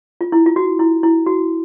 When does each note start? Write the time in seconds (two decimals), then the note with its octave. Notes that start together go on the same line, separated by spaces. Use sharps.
0.21 F4
0.32 E4
0.46 F4
0.56 F#4
0.79 E4
1.03 E4
1.26 F#4